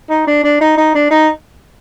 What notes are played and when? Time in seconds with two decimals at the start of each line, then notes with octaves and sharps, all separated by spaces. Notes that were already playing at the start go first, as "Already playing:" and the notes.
0.10 D#4
0.27 D4
0.44 D4
0.61 D#4
0.78 D#4
0.95 D4
1.11 D#4